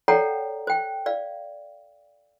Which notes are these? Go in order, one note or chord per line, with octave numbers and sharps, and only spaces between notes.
A4 C#5 D5 F#5 G5 A#5
C5 G5
D5 F5